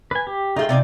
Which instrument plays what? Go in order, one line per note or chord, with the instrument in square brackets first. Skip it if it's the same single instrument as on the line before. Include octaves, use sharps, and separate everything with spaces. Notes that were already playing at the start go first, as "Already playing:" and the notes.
[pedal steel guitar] B4 G#5
G4
[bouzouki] A3 G#4 [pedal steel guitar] D#4 F4 G5
[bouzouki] C3 D5 G#5